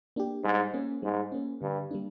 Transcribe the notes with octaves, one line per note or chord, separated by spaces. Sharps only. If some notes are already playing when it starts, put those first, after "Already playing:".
A#3 D4 G4
G#2 G3
A#3 C#4
G#2 G3
A#3 C#4
G2 D3
G3 A#3 D4